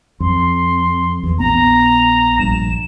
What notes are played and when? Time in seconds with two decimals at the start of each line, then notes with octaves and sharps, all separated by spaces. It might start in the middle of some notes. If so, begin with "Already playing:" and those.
0.20 F2 C6
1.23 E2
1.39 A#1 B3 A#5
2.39 A#1 G2 E7